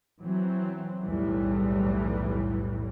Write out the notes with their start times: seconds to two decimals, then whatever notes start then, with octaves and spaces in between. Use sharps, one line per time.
0.20 E3 F#3 C4
1.03 B1 E2 A2 E3 G3